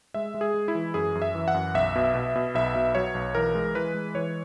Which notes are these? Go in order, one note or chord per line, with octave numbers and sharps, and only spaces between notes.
G#3 E5
G#3
G#4
G#3
E4
E3
F#2 G#4
F#2
E5
E3
F#5
F#2
B1 E5
B2
B2
B2
B1 E5
B2
F#3 C#5
B1
E3 A#4
G#3
E3 B4
G#3
E3 C#5